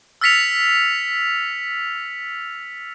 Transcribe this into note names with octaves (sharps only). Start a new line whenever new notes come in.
E6 F6 A6 B6 C#7 F7